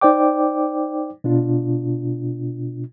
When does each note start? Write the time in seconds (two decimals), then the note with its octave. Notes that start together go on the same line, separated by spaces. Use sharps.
0.01 D#4 C5 D5 G5 D6
1.24 B2 D4 F4